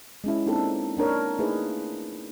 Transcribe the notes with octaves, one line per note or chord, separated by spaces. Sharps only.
G#3 C#4 E4
A#3 C4 D4 D#4 G4 A4
A#3 D4 A#4 C#5
A3 A#3 D#4 E4 G#4 B4